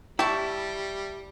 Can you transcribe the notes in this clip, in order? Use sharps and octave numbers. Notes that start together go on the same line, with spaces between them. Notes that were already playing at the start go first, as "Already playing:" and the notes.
G3 E4 G4 A5 C#6